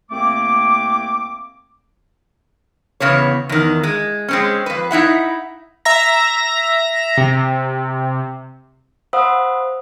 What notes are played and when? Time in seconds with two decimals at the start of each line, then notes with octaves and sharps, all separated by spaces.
0.11 C2 A3 A#3 C4 D6
3.00 E2 C#3 B3 C#5
3.49 E2 D#3
3.83 G#3
4.28 G#3 C4 C#4
4.66 F2 B4
4.91 D#4 E4 E5 F#5
5.85 E5 A#5 A#6
7.17 C3
9.13 C5 F5 F#5 B5 D#6 E6